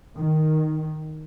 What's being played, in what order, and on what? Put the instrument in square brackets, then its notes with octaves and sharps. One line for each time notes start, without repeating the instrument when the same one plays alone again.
[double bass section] D#3